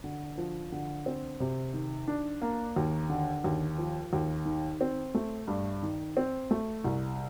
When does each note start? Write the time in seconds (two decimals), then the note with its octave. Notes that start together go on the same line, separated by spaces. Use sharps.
0.04 D3
0.38 F3
0.72 D3
1.06 C4
1.40 C3
1.74 D#3
2.08 D4
2.42 A#3
2.76 D#2
3.10 D3
3.44 D#2
3.78 F3
4.13 D#2
4.46 D#3
4.81 C4
5.15 A3
5.48 G2
5.83 D#3
6.17 C4
6.51 A3
6.84 C2